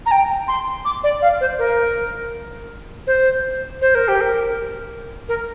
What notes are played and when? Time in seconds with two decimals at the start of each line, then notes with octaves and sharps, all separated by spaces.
0.06 A#5
0.11 G5
0.48 C6
0.85 D6
1.04 D5
1.22 F5
1.41 C5
1.59 A#4
3.07 C5
3.81 C5
3.95 A#4
4.08 G4
4.21 A#4
5.29 A#4